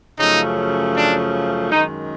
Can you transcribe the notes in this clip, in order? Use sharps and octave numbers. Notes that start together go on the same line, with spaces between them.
F#2 C#3 F3 A3 D#4
D4
F#2 D#3 G#3 D#4